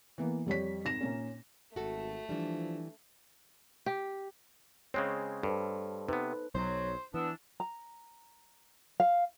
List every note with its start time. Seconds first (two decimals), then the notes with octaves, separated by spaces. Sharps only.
0.18 E3 A#3 B3
0.46 F2 G3 C#5 B6
0.85 G#1 A#6 E7
1.01 A#2 A#3 C#4
1.76 G#1 A3 F#4 A4
2.29 E3 F3 G3 D4
3.86 G4
4.94 C#3 G#3 C4 C#5
5.43 G2 A4 C5
6.08 C3 B3 D#4 B4
6.55 B1 F#3 C5
7.14 E3 B3 D4 E6
7.60 A#5
9.00 F5